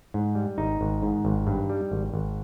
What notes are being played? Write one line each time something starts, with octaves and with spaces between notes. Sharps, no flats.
G#2
G3
G#1 D#4
G#1
G#2
G#1
G2
G3
G#1
G#1